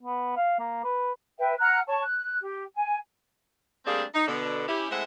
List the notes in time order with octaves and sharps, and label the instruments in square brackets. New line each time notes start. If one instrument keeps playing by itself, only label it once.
[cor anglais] B3
F5
A#3
B4
[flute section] B4 E5 G5
F#5 A#5 F6 F#6
C#5 A5 C#6
F#6
G4
G#5
[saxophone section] G3 A3 A#3 C4 D4 G#4
D#4
B2 D3
C#4 E4 G4
G#3 A3 C4 E4 E5 F#5